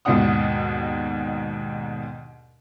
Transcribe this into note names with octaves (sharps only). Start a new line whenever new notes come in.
D#2 G#2 B2 D4 F#5 D#6